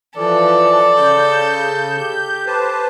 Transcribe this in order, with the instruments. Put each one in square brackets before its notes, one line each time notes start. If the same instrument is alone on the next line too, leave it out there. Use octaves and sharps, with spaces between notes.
[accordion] E3 F3 [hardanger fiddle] A4 [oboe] D5
[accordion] C#3 G6
[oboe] G4 [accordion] G6
[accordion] B4 C5 A5